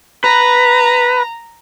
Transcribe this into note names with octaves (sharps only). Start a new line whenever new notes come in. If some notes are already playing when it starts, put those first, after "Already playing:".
B4 A#5